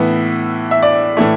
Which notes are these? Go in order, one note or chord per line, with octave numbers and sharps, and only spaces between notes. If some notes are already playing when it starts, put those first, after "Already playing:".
Already playing: A2 E3 B3 E5
E5
D5
A2 E3 A3